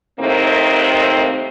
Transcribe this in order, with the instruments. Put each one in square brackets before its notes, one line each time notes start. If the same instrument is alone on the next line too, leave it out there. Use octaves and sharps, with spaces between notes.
[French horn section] A2 C3 D#3 A#3 C4